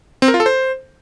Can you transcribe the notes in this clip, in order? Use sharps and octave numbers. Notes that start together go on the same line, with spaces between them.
C4
A#4
F4
A4
C5